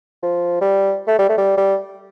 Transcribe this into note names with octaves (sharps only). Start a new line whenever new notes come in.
F3
G3
A3
G3
A3
G3
G3